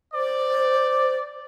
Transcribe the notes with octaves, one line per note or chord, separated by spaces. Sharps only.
C5 D5